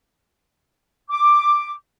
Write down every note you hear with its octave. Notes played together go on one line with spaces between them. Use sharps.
D6